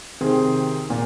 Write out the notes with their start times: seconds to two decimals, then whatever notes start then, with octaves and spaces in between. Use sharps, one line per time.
0.21 C3 D#3 C4 G#4
0.90 A#2